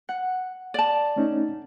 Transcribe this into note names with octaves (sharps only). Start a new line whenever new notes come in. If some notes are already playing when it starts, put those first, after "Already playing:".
F#5
D5 A5
A3 C#4 D#4